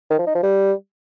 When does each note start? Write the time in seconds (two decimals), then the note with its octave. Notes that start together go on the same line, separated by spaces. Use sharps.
0.10 D#3
0.18 F3
0.27 D#4
0.35 F3
0.43 G3